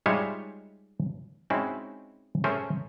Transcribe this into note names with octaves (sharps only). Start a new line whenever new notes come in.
G3 G#3 D#4 F4 C#5 E5
G#3 C4 C#4 D#4 E4 F#4
A3 C#4 G#4 A#4 C5 G#5